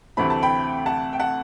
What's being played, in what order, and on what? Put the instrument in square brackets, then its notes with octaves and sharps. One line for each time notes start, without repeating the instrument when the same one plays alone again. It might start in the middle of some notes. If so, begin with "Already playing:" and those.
[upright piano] D2 C3 E3 A3 C4 B5
A5
G5 B5
F#5 A5
G5
F#5 A5